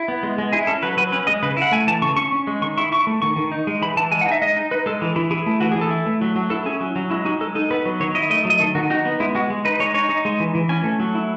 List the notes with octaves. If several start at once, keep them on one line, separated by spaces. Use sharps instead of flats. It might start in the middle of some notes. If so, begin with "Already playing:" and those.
Already playing: E4
B3
G#3
G#3
E4 G#4
C#4 A4
F#3 B4
F#3 B4
C#4 B4
G#3 D#5
C#3 B4
E4 F#5
A3 G#5
E3 A5
C#3 C#6
C#4 C#6
C#4
G#3
D#3 C#6
E4 C#6
E4 C#6
A3
D#3 C#6
D#3
D#4
G#3
E3 B5
E3 A5
G#3 G#5
F#5
D#4
E5
G#3 D#5
D#4
D#4 B4
G#3 A4
E3
E3 E4
E4 G#4
A3
E3 F#4
G#4
E3
A4
E4
A3
F#3
F#3
E4 A4
C#4 G#4
F#3
F#3
G#3 E4
D#4 F#4
G#3 A4
D#4 A4
B3 B4
F#3
D#3 C#5
E4 D#5
A3 D#5
F#3
D#5
D#3 A4
D#3 F#4
D#4 F#4
B3
G#3 E4
G#3 F#4
G#3
D#4 B4
G#3 C#5
D#4 C#5
D#4
G#3
E3
E3
C#4 G#5
A3
F#3
E4